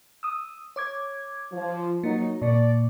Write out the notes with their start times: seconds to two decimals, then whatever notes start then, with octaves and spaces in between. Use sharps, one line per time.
0.23 D#6 E6
0.76 C#5 D6 G#6
1.52 F3
2.03 F#3 A#3 D#4
2.42 A#2 A#3 D5